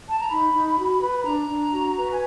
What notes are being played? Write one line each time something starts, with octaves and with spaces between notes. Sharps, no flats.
A5
A#5
D#4 B5
D#4
F#4
B4
B5
D4 A#5
D4
F#4
B4
G#5